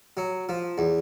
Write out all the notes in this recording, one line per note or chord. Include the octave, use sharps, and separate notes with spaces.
F#3
F3
E2